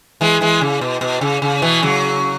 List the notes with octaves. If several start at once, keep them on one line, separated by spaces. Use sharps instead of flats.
E3 G#3
E3 G#3
C#3
B2
B2
C#3
C#3
B2 E3
C#3 F#3